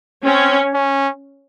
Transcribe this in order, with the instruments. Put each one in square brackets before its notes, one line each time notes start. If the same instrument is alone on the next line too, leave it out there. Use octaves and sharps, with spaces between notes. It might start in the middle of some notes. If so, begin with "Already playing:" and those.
[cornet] C4 [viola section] C#4
[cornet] C#4